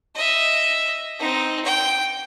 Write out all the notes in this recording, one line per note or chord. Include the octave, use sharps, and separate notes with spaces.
D#5 E5
C4 D#4
G5